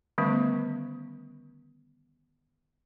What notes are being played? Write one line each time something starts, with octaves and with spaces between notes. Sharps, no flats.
D3 D#3 G3 A3 B3 C#4